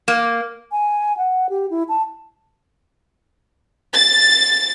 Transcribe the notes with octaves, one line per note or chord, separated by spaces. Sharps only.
A#3
G#5
F#5
G4
E4
A5
A6